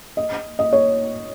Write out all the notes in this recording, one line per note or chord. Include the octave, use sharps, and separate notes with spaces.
D#5
D#5
C#5